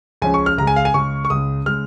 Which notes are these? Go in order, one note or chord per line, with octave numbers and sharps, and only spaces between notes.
C#2 C#3 F3 C#4 G#5
C#6
F6
C#2 C#3 G#3 A#5
G#5
F5
G#5
C#2 C#3 G#3 C#6
C#6
C#2 C#3 G#3 D#6
C#3 G#3 F6